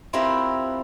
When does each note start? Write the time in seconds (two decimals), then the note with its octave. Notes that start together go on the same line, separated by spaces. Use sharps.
0.13 C4 E4 F4 G4 A#4 B4